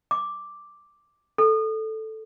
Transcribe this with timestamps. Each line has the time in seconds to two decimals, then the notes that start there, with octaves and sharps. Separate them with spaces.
0.11 D6
1.38 A4